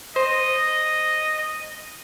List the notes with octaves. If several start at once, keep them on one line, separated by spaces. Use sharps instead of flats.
C5 D#5